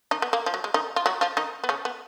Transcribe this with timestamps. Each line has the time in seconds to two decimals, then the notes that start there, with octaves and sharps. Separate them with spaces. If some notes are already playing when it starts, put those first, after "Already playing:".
0.11 D#3 D#4
0.22 B3
0.33 A#3
0.46 F3
0.54 F#3
0.64 G#3
0.74 D#3 D#4
0.96 F4
1.06 F#3 F#4
1.21 F3 F4
1.37 D#3 D#4
1.64 B3
1.69 C#3 C#4
1.85 B3